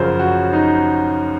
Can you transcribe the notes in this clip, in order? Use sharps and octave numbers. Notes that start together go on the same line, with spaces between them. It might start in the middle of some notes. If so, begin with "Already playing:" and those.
Already playing: F#2 C#3 F3 A#4 C5
F#4
D#4